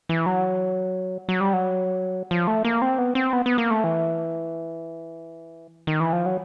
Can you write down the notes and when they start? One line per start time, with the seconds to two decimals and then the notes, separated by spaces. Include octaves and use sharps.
0.09 E3
0.26 F#3
1.29 F#3
1.41 G3
1.53 F#3
2.31 F3
2.47 A3
2.65 A#3
2.82 C4
2.98 B3
3.15 C4
3.33 B3
3.46 B3
3.58 A#3
3.71 A3
3.84 E3
5.87 D#3
6.00 E3
6.13 F3
6.26 F#3